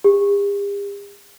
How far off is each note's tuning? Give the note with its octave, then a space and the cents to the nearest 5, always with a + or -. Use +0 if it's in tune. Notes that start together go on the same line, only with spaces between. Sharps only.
G4 +45